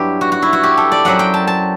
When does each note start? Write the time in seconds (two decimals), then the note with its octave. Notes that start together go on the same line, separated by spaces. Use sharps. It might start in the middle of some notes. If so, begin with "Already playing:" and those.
Already playing: G2 F#3 B3 D4 E4 G4
0.21 F#4
0.32 F#4
0.42 E4
0.53 F#4
0.63 G4
0.77 A4
0.92 D5
1.05 F#2 F#3 C4 F#5
1.19 G5
1.34 A5
1.47 A5